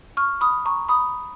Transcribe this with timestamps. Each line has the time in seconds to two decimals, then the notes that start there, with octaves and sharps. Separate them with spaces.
0.17 C#6 F6
0.41 B5 D#6
0.66 A#5 C#6
0.89 B5 D#6